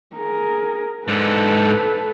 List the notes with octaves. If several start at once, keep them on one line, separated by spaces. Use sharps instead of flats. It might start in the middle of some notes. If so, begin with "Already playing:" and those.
G#4 A#4
G#2 D3 A4 B4